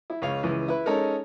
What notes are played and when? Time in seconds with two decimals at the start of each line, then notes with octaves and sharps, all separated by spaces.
0.10 E4
0.22 C#2 C#5 F5
0.43 C#2 E3
0.68 E4 B4
0.86 G#3 C#4 D#4 A4 A#4